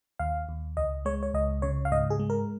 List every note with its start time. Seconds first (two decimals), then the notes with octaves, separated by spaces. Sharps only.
0.19 D#2 F5
0.49 D#2
0.77 C#2 D#5
1.05 G#3 C#5
1.23 C#5
1.34 C#2 D#5
1.62 C#3 C#5
1.85 F5
1.92 G#2 D#5
2.10 G#4
2.19 G#3
2.30 A#4